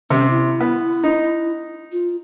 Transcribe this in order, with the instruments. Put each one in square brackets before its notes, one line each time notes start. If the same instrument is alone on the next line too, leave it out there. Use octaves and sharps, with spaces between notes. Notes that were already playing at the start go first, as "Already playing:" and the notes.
[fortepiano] C3 [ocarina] C#4
[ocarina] E4
[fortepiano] B3
D#4
[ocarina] F4